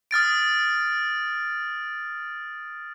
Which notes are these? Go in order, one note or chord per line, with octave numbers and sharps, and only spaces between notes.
D#6 F6 A6 D7